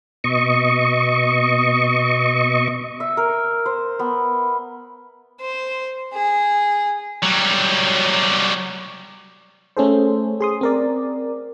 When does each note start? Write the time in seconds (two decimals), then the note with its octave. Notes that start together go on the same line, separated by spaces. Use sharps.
0.24 B2 D#5 C#6
3.00 E5
3.17 A#4
3.66 C5
3.99 B3
5.41 C5
6.14 G#4
7.23 F#3 G3
9.77 A3 C#4 G#4 A4 C5
10.40 G#4 C6 D#6
10.61 C4 A#4 D5